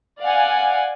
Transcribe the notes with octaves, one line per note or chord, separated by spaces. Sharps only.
D5 F5 F#5 G#5